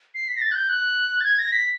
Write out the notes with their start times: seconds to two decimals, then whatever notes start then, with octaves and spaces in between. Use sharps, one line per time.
0.15 C7
0.28 B6
0.36 A#6
0.41 A6
0.51 F#6
0.55 G6
0.69 F#6
1.20 A6
1.24 G#6
1.39 A#6
1.52 B6